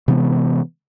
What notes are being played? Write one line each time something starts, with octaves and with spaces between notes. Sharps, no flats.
C3 E3 G#3 B3